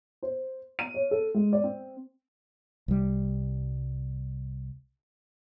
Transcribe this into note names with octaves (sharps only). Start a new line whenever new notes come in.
C5
D#7
C#5
A4
G#3
D5
C4
C2 G3